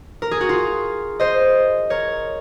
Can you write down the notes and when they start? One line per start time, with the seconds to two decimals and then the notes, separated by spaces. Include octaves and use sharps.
0.22 A#4
0.31 G#4
0.41 F#4
0.49 F4
1.20 C5 D#5
1.90 A#4 C#5